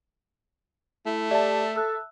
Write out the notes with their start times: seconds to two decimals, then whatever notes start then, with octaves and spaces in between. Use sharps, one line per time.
1.06 A3 E4
1.31 G4 D5 E5 A5
1.76 A4 E6 F#6